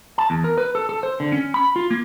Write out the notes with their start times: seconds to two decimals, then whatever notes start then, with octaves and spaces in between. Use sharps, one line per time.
0.18 A5
0.30 E2
0.44 A#4
0.58 B4
0.75 A4
0.89 A4
1.03 C5
1.20 D3
1.32 C#4
1.54 B5
1.76 F4
1.91 A#3